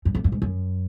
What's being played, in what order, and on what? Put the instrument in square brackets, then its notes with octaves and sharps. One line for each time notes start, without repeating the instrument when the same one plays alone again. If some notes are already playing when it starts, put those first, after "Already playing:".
[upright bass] F#2
F2
F#2
G#2
F#2